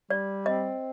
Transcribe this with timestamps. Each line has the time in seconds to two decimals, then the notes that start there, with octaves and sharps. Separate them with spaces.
0.10 G3 D5
0.46 C4 D#5